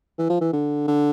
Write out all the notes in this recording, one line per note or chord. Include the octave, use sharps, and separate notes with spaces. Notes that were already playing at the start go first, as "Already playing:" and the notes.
E3
F3
E3
D3
D3